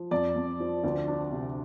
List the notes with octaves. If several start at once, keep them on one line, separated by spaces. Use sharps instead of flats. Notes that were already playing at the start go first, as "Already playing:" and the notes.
Already playing: F3
F2 D5
F2
F3
D2
D4
C3